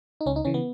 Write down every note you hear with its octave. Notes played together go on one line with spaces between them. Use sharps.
D#4
C#2 C#4
D#4
C#3 E3 C#4
B3